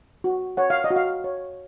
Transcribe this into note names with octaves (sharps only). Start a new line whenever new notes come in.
F#4
C#5 F#5
F5
D#5
F#4
F5
C#5